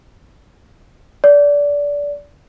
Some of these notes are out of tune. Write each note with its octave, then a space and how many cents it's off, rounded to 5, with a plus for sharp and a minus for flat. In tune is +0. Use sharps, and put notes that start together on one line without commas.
D5 -20